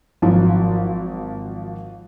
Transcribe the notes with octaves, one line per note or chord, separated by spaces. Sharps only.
G#1 F3 F#3